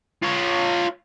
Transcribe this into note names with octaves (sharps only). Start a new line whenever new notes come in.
F4 C#5